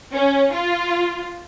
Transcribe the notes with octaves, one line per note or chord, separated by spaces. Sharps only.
C#4
F4